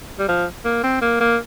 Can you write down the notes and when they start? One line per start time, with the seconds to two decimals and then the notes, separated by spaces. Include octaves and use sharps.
0.19 G3
0.28 F3
0.65 A#3
0.83 C4
1.01 A#3
1.20 A#3